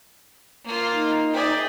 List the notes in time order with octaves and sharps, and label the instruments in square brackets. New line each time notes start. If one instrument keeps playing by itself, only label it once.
[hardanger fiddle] A#3 F4
[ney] D#4
[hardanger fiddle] G#4 E5 [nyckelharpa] D5 G5